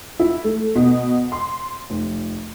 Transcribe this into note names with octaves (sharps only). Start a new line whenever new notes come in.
E4
A3
B2
C6
F1